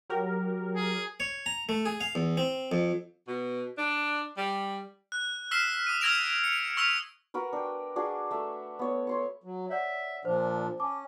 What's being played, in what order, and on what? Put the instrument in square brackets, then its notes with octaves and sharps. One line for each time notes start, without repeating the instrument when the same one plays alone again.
[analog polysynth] F#3 G4 A#4
[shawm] G#4
[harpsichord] C#5
A#5
A3
G#4
F5
E2
C4
F2
[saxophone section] B2
D4
G3
[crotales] F#6
E6 F6 B6 C7 E7
D#6 D#7
E6 F6 G#6 A#6 D7 F7
C#7 D7
C#6 E6 F6 B6 F7
[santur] F#4 A#4 B4
D4 G5
D4 F#4 G#4
A3 E5
B3 C#5
C#5 C6 C#6
[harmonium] F#3
[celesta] C#5 D5 F#5 [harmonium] E5
[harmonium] A#2 F3 D4 [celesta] C5
[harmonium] C#4 [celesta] A5 D6